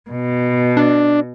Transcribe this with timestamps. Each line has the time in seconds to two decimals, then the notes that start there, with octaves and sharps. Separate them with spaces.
0.10 B2
0.77 D4